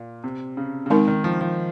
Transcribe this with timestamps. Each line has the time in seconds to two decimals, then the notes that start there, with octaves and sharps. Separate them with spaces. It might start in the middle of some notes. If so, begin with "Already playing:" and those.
Already playing: A#2
0.24 C3
0.57 C#3
0.86 C#3
0.90 D#3 G#3 C4 D#4 A#4
1.08 D#3
1.24 F3
1.41 F3